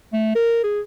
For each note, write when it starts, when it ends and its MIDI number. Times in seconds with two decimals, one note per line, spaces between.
0.13 0.33 57
0.35 0.59 70
0.64 0.81 68